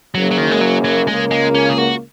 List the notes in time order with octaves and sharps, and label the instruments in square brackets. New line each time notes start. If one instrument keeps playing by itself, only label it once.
[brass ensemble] F#1 F#2 C#3 A#3 [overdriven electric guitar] F#3
[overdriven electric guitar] F#3
D#3
G#3
F#3
F#3
[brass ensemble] C#2 C#3 A#3 [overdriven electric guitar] G#3
[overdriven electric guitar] G#3
C#4
G#4
F#4